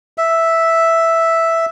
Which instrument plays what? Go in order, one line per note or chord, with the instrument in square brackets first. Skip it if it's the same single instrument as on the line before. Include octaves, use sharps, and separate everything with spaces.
[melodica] E5